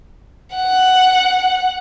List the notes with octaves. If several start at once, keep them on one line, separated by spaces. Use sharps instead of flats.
F#5